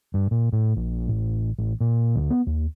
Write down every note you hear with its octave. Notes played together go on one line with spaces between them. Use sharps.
G2
A#2
A2
A#1
A1
A1
A#2
D2
B3
D#2